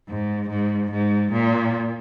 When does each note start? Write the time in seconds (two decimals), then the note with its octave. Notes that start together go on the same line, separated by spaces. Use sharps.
0.08 G#2
0.50 G#2
0.91 G#2
1.32 A#2